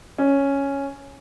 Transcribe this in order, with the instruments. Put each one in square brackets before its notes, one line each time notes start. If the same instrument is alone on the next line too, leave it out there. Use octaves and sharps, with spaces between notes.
[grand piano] C#4